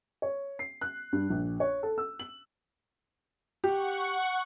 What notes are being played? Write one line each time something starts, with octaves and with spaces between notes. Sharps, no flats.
C#5
C7
F#6
G2
A#1
C#5
A4
E6
F#7
G4 F#5 C#6